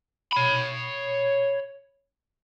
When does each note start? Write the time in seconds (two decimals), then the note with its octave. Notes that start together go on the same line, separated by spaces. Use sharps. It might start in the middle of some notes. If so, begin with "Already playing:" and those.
0.33 C#5 B5